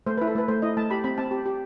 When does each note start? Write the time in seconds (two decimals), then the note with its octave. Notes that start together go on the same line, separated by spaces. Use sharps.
0.07 A3 C5
0.18 E4 B4
0.27 A4
0.35 A3 B4
0.48 A3 C5
0.62 E4 D#5
0.77 A3 A5
0.90 G4 B5
1.04 C4 B5
1.18 C4 A5
1.31 G4
1.46 G4